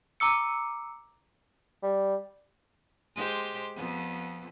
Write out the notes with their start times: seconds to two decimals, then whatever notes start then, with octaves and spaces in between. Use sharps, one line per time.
0.20 A#5 D6 E6 C#7
1.83 G3
3.15 G#3 G4 C5
3.76 F2 B3